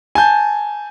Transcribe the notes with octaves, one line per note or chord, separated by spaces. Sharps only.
G#5 A5 G6